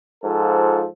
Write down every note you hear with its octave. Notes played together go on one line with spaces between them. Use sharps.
G#2 F3 F4 A4